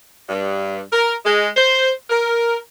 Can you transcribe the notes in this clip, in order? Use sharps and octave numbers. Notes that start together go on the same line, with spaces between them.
G2
A#4
G#3
C5
A#4